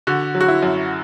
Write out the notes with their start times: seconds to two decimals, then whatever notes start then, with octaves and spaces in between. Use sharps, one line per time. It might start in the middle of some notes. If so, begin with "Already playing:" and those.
0.07 D3 F#4
0.35 F#3
0.41 F#4
0.48 E4
0.63 F#2